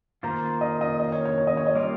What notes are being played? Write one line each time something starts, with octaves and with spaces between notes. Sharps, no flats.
D#3 A#3 F4 C5 A#5
D#5
D#5
D#5
C#5
C#5
C#5
D#5
C#5
D#5
G3 A#3 F4 A#4